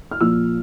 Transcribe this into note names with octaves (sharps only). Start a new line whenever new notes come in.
F6
A#2 F3 E6